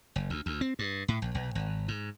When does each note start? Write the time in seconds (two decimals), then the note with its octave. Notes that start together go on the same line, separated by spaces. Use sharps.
0.16 F#1
0.30 D2
0.46 D2
0.61 C4
0.79 G2
1.08 A2
1.22 A#1
1.35 B1
1.55 G#1
1.88 G#2